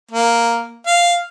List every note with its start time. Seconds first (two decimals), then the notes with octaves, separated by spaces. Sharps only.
0.11 A#3
0.87 F5